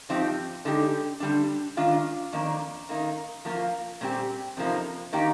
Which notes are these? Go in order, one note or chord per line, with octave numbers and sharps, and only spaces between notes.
G2 F3 C4 D#4 G4
D3 G#3 D#4 G4
D3 G3 D4
D#3 G#3 D4 F4
F2 D#3 A#3 D4
D#3 A#3 D#4
F3 A#3 F4
A#2 G3 C4 G4
F2 C3 F3 A#3 D#4
D#3 A#3 D#4 G4